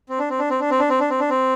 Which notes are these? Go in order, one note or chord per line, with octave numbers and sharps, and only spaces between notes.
C4
D4
C4
D4
C4
D4
C4
D4
C4
D4
C4
D4
C4